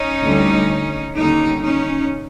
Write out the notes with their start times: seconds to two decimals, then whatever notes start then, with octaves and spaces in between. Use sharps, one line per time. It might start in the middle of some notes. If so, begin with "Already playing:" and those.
Already playing: C#4 D#4
0.23 D2 D3 G3
1.16 D#2 D3 G3 C#4 D#4
1.62 C#4 D#4